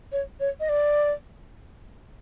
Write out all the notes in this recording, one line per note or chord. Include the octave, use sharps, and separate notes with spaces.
C#5
C#5
D#5
D5